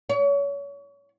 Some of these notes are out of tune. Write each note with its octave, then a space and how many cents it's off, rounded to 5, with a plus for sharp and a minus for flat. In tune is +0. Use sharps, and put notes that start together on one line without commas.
C#5 +30